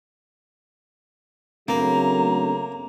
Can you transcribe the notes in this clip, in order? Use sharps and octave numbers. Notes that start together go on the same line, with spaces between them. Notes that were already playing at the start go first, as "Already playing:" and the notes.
C#3 F#3 A3 A#3 C4 D4 B4 A#5